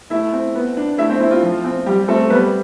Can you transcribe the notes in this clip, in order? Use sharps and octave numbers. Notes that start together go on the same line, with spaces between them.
A3 E4 E5
C4
B3
D4
A3 E4 E5
C4 C5
C4 E4
F4
F3
C4
G3 G4
A3 C4 A4
G3 B3 B4